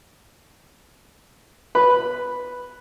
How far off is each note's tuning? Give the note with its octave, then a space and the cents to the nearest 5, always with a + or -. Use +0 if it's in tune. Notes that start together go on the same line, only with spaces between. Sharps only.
B4 +0 B5 +0